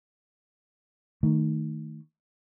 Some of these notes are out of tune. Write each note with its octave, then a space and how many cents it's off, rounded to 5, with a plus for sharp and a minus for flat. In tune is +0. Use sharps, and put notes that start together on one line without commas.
D#3 +0 A3 +15